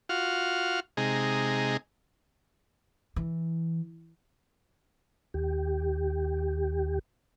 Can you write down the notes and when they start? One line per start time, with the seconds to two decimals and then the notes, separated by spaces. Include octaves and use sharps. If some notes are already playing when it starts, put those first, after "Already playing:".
0.09 F4 F#4 F6
0.97 C3 G#3 D#4 G#4 A#5
3.16 E3
5.34 D#2 G4